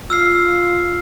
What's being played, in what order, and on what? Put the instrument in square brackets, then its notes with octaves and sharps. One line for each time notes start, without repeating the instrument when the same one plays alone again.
[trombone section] F4 [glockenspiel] E6 F6 C7